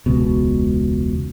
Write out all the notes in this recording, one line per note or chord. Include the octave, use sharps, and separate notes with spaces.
E1 C#2 B2